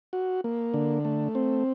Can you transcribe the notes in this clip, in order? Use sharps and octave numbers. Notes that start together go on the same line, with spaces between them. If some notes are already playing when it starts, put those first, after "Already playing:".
F#4
A#3
D3
A3
C4